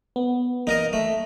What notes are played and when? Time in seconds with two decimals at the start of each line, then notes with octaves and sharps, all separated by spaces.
0.16 B3
0.67 A#3 D#4 A#4 D#5
0.93 A3